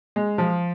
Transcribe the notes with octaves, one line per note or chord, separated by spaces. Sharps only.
G#3
F3